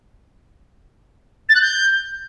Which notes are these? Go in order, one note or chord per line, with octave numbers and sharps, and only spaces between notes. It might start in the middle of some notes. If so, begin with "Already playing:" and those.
A6
F#6
G6